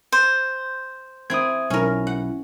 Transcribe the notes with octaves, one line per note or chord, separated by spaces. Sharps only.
C5
C4 E4 D#6 G#6
B1 C#4 E4 A#4
F#5